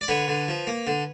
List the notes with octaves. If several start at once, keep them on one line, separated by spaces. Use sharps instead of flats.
D5
D3 B4 C#5
D3
F3
A#3
D3